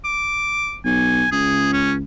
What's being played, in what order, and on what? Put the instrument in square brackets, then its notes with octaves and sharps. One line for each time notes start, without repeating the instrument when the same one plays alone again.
[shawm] D6
[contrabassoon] B1 [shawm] G#5
[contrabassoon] C#2 [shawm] G#4
[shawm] C#4